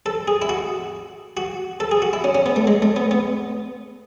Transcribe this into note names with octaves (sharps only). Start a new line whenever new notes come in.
A4
G#4
E4
F#4
F#4
A4
G#4
F#4
E4
C#4
C#4
B3
A3
G#3
A3
B3
B3